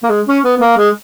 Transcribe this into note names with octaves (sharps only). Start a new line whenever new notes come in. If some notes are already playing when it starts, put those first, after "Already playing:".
A#3
G#3
C#4
B3
B3
A#3
G#3